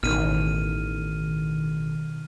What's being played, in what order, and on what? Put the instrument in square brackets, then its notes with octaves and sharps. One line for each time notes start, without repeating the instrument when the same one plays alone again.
[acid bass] A1 [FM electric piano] B2 D#3 [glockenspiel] F6 D#7